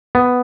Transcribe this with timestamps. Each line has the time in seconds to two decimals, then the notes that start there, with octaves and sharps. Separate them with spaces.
0.15 B3